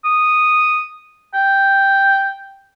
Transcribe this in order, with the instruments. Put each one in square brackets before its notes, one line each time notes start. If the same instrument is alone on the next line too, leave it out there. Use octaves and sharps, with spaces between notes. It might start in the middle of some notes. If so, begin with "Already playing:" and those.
[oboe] D#6
G5